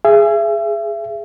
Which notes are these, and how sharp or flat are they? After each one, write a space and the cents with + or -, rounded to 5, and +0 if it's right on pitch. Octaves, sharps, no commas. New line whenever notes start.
G#4 +0 E5 +35